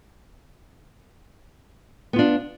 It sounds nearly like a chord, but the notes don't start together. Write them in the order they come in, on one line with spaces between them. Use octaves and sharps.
B3 F4 D4